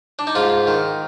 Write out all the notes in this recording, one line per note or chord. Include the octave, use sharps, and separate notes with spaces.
D4
D#4
G#2 F4
D#3